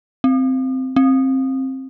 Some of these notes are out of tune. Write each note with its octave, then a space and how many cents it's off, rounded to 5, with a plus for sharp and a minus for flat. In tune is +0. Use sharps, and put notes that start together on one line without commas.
C4 -5
C4 +20